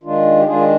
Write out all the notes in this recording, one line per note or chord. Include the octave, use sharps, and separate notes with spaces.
D#3 G#3 D4 F4
G4
D#3 G#3 D4 F4 G#4